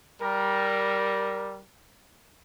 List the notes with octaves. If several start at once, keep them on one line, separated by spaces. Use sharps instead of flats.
G3 A#4